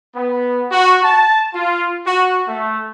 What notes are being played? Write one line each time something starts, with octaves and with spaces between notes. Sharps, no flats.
B3
F#4
A5
F4
F#4
A3